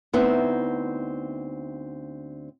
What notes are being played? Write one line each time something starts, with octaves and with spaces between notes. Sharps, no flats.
D2 B3 C4 D#4 E4